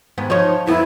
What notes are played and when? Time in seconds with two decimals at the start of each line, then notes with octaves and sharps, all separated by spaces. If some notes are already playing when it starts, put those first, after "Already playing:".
0.18 D#2 G#2 B3
0.30 F3 D#4 C#5
0.67 F2 B3 E4